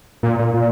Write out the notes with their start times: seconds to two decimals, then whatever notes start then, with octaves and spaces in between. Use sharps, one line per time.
0.23 A#2
0.39 A#2
0.54 A#2